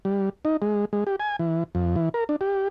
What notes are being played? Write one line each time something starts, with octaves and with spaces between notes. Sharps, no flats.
G3
D#4
G#3
G#3
G4
G#5
E3
F2
E3
A#4
D4
G4